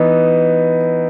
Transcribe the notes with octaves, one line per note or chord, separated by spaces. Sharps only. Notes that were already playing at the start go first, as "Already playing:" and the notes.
Already playing: E3 B3 D#4